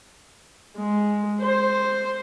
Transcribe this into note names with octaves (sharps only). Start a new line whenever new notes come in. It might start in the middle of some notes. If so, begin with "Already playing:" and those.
G#3
C5